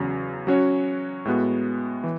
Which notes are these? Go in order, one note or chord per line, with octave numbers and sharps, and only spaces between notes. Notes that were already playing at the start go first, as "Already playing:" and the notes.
Already playing: E2 C#3 F#3
F#3 C#4 F#4 C#5
A2 G#3 B3 F#4
E3